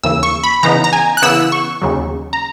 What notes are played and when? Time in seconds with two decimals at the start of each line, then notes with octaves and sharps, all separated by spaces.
0.03 D#2 C#3 E3 A#3 E6
0.23 C#6
0.43 B5
0.63 C#3 E3 B3 D#4 A#5
0.84 A#5
0.93 G#5
1.17 F#6
1.22 C#3 E3 B3 E4 E6
1.52 C#6
1.82 D#2 C#3 F#3
2.33 A#5